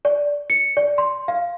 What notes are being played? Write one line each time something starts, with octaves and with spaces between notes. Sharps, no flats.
D5
C#7
D5
C6
F5